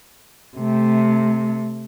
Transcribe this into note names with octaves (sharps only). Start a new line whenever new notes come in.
C3 A3